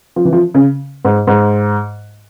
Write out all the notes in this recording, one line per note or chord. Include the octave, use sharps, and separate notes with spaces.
F3
E3
F3
C#3
G#2
G#2